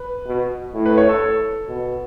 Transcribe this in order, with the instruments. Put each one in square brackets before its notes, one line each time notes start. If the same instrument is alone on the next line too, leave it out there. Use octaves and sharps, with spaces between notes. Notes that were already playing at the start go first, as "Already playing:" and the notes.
Already playing: [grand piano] B4
[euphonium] B2
A2
[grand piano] B4
C#5
A4
[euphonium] B2